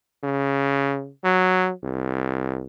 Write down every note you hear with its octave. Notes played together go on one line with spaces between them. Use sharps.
C#3
F#3
C2